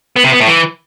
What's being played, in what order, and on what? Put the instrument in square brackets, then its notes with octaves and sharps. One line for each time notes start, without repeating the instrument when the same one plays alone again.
[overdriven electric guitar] B3
C3
B3
A2
E3